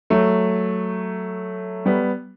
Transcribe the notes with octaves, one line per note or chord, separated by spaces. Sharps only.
F#3 A3
G3 B3